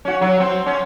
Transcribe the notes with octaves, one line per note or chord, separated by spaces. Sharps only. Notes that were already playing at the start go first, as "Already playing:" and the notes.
C#4 F#4
F#3
C4
C#4